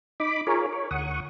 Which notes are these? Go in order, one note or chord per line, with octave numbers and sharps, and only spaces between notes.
D#4 B5 D6
F4 G#4 A#4 C#5
C#5
D2 F#5 C#6 D#6